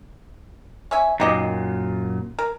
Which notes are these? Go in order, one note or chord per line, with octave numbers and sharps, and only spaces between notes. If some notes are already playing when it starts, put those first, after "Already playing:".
C#4 E5 G#5
F#2 A#2 D#4 G4 D#5
A#4